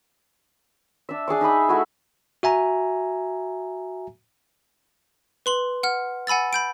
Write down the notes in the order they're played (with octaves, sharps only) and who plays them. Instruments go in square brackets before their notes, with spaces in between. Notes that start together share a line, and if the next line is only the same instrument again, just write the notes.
[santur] D4 E5
D4 G#4 C#6 D6
D#4 E5 B5 D#6
A3 E4 F#4 G#5
[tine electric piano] F#4 E5 G#5 A#5
[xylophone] B4 C6 F#7
F#5 F6
F#5 G#5 B5 E6 A6
B5 G6 D7